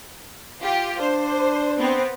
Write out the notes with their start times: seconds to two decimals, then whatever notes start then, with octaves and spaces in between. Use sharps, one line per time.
0.61 F4 G4
1.00 D4 C5
1.78 B3 C4